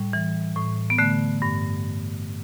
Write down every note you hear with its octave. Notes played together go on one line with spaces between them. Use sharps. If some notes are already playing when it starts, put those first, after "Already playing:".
Already playing: A2 G3
E3
A2
B3
D3 A3
G2